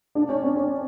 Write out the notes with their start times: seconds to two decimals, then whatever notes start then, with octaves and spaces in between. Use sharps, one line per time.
0.15 D4
0.29 C#4
0.42 C4
0.56 C#4